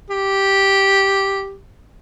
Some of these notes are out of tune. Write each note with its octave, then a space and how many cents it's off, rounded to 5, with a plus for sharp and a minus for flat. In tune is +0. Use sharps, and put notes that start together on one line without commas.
G4 -5